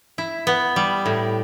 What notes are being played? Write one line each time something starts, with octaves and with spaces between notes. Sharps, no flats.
E4
B3
G3
A2